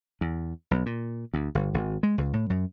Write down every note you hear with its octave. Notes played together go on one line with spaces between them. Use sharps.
E2
B1
A#2
D2
G1
G#1
G#3
C#2
A2
F#2